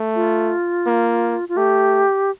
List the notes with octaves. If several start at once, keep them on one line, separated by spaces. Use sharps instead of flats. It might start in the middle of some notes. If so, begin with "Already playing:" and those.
Already playing: A3
F4
A#3
F4
A3 G4